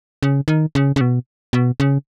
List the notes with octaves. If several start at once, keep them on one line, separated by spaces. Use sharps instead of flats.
C#3
D#3
C#3
C#3
B2
B2
C#3